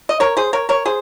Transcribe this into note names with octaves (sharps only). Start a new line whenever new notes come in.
D#5
A#4 C#5
G#4 C5
A#4 C#5
A#4 C#5
G#4 C5